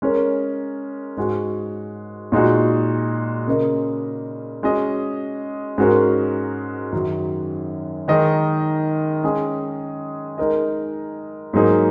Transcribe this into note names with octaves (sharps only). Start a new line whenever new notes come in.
G#3 C#4 A#4 C#5
G#2 G#3 F#4
A#2 G#3 D#4 F#4
C#3 A#3 C#4 A#4 D#5
G#3 C#4 F#4 D#5
G#2 G#3 C#4 F#4 A#4
F#2 D#3 F#3 C#4
D#3 G#3 D#4 A#4 D#5
G#3 C#4 G#4 D#5
G#3 D#4 A#4 D#5
G#2 F#3 A#3 D#4 G#4